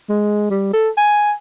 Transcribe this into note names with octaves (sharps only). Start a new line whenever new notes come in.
G#3
G3
A4
G#5